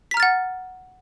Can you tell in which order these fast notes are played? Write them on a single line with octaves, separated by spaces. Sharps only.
B6 A#5 F6 A6 F#5